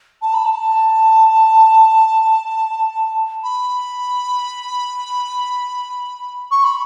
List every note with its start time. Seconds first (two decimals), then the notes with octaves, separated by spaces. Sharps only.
0.22 A5
0.34 B5
0.45 A5
3.43 B5
6.51 C#6
6.64 B5